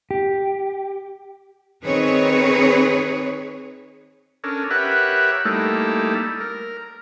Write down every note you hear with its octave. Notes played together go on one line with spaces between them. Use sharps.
G4
D#3 C4 G#4 B4 C#5
C#4 D4 A4 A#4
G4 A#4 B4 C#5 E5 F#5
G3 A3 A#3 D#4 E4 A4
A#4